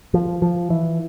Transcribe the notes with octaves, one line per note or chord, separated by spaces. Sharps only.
F3
F3
E3